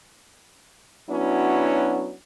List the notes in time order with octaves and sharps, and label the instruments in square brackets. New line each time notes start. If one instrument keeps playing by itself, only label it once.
[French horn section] F#3 B3 C#4 D4 E4 F#4